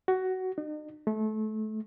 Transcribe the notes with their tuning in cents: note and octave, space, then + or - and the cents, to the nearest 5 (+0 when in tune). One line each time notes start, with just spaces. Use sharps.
F#4 +15
D#4 -45
A3 -25